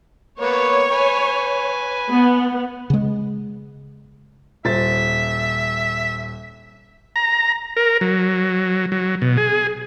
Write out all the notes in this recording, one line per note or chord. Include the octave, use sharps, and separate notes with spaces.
A#3 B3 B4 C#5
B4 G#5
B3
C#3 G#3
D#1 C5 E5 A6
A#5
A#4
F#3
F#3
B2
G#4